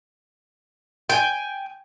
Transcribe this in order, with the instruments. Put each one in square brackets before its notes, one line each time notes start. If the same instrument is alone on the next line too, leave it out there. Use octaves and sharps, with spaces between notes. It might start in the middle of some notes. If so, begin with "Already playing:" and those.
[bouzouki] G5 G#5